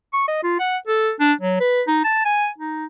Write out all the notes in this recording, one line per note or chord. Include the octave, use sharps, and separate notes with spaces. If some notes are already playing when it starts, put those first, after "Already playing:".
C#6
D#5
F4
F#5
A4
D4
F#3
B4
D#4
A5
G#5
D#4